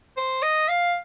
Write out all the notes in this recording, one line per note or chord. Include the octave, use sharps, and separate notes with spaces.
C5
D#5
F5